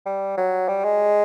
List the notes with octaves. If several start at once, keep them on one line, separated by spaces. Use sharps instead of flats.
G3
F#3
G3
G#3